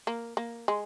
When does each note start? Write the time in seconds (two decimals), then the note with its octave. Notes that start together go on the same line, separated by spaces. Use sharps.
0.07 A#3
0.37 A#3
0.68 G#3